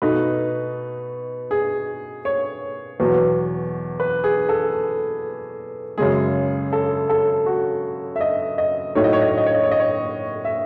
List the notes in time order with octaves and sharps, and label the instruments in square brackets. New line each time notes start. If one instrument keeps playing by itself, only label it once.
[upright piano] B2 A3 D#4 B4
G#4
C#5
E2 B2 F#3
B4
G#4
A4
F#2 C#3 G#3 G#4
A4
A4
F#4
E5
D#5
D#5
A2 F#3 A3 D#4 C#5
D#5
C#5
D#5
C#5
D#5
C#5
D#5
C#5
D#5
C#5
E5